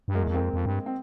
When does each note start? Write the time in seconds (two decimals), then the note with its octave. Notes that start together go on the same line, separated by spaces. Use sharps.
0.08 G2
0.15 F#2 G#3 A#3
0.24 E2
0.28 F2
0.34 E2 A#3 C4
0.40 F2
0.54 F2
0.66 G2
0.86 C4